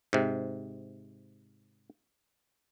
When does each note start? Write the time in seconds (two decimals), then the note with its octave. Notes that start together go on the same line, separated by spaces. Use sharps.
0.13 G#2 C3